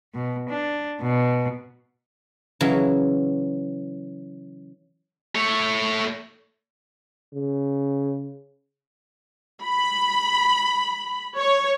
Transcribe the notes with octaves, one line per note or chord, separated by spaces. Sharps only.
B2
D4
B2
C#3 E3 F#3
A3 C#5
C#3
B5
C#5